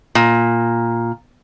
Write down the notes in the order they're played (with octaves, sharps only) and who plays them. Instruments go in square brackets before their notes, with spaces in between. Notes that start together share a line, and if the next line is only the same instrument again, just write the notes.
[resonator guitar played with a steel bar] A#2